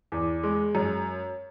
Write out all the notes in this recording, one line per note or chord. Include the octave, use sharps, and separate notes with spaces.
E2
G#3
F#2